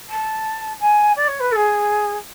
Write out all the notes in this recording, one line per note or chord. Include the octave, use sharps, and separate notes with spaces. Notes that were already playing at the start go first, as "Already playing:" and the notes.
A5
G#5
D5
C#5
B4
A4
G#4